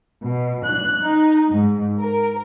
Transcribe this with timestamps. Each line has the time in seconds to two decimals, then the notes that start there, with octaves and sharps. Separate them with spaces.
0.23 B2
0.65 F#6
1.05 D#4
1.50 G#2
2.01 A#4